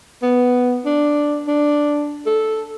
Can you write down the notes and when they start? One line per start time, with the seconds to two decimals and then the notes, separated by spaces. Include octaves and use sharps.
0.22 B3
0.85 D4
1.47 D4
2.26 A4